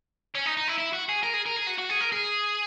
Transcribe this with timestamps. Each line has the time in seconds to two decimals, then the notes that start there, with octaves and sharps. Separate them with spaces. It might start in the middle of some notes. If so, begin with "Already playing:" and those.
0.35 C#4
0.46 D#4
0.57 D#4
0.68 E4
0.78 E4
0.93 F#4
1.09 G#4
1.23 A#4
1.33 G#4
1.46 A#4
1.56 G#4
1.67 F#4
1.78 F#4
1.89 G#4
2.00 A#4
2.12 G#4